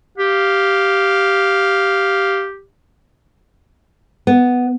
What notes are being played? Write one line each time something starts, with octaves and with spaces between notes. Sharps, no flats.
G4 F5
B3